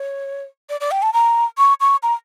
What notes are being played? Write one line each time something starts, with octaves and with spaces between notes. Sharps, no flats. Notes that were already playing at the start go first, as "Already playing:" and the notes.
Already playing: C#5
D5
D5
G5
A5
A#5
C#6
C#6
A#5